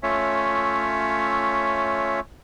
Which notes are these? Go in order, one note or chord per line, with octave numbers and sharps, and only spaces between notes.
A3 C#4 F4 C#5 E5